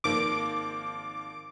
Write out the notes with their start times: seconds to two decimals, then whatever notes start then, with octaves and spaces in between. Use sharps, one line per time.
0.04 G#1 F3 A#3 D6